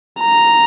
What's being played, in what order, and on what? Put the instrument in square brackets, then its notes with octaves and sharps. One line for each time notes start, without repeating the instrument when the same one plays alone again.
[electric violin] A#5